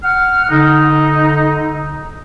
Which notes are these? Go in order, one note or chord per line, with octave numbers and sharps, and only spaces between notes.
F#5 F6
D3 D#4